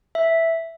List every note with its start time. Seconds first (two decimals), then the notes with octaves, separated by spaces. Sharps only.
0.15 E5